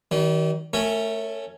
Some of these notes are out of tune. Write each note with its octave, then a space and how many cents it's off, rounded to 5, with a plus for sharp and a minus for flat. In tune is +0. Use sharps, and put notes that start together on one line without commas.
D#3 +30 G3 -40
A3 +0 C#4 +0 A#4 -40